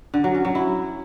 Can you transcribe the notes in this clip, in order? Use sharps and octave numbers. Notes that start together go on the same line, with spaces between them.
D3
F#3
C#4
F#3
E4